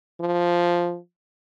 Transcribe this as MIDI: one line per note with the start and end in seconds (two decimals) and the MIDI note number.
0.20 0.97 53